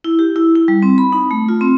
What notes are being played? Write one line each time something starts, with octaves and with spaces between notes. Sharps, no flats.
E4
G4
E4
E4
G3
C4
B5
D#4
A3
F4
C4